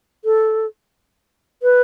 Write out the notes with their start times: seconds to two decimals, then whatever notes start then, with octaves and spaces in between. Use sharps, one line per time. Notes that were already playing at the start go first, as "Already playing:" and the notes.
0.25 A4
1.63 B4